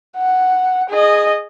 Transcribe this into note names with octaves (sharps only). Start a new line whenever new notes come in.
F#5
G#4 D#5